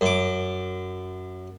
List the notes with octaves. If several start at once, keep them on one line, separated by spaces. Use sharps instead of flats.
F#2 D6